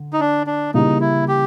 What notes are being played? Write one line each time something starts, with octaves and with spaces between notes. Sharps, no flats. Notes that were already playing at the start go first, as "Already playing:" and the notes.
Already playing: D3
D#4
D4
D4
C#3 E3 G3 A#3 D#4
E4
G4